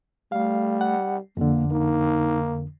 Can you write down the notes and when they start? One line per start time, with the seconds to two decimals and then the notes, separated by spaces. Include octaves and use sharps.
0.32 G3 A3 F5
0.81 F#5
1.37 F2 D3 A#3
1.71 A#3 D#4